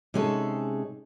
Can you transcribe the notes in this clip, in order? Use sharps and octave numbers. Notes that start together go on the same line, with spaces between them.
C3 G#3 C#4 D#4 G#4 A4